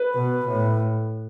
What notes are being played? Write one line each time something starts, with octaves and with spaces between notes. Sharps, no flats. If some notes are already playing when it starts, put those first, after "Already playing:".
Already playing: B4
B2
A2